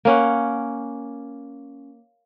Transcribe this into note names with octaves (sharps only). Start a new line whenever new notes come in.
A#3 C#4 F#5